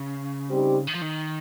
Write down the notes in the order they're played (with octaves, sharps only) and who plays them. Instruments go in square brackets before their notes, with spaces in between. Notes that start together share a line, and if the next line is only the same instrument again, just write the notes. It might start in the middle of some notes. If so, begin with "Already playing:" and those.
Already playing: [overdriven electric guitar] C#3
[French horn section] G3 C4 D#4 G4
[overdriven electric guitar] D#3
F3
D#3